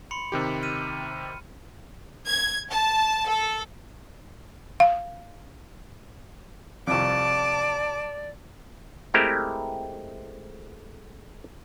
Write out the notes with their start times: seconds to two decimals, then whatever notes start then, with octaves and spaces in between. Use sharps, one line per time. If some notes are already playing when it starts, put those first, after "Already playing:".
0.11 B5 C6 C#7
0.32 C3 D#3 G4
0.63 F6 D#7
2.27 G#6
2.70 A5
3.27 A4
4.80 F5
6.87 C2 F2 D5 A5 D6
9.14 G#3 A3 C4 E4 G4 A#4